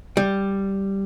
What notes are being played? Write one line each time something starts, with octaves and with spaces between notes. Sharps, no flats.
G3